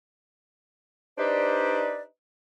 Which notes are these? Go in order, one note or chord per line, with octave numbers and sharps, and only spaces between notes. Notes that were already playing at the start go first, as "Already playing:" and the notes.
D4 D#4 G4 B4 C5 D5